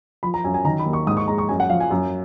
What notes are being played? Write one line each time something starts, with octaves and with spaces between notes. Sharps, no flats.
F3 B5
A#5
F#2 G#5
G#5
D#3 A#5
B5
D#2
C#6
G#2 D#6
C#6
G#3 A#5
C#6
F#2 G#5
F#5
F3 F5
G#5
F#2